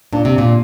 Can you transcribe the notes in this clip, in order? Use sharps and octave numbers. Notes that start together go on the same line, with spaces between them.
A#2 D4
C3
A#2